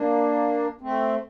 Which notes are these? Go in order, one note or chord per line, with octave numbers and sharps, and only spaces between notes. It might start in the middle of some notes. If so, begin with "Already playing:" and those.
Already playing: A#3 D4
A3 C4